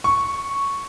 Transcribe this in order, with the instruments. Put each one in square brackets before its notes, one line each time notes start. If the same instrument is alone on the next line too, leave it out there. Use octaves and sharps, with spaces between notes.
[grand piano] C#6